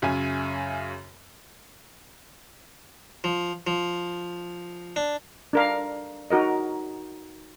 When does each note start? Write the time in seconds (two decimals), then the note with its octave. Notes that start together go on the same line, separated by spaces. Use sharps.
0.02 F#2 C#3 E5 G#5
3.24 F3
3.67 F3
4.96 D4
5.53 D4 A#4 F5
6.31 D#4 F#4 A#4 D#5